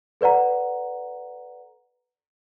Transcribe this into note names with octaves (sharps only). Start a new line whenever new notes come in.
A4 B4 D5 F#5 A#5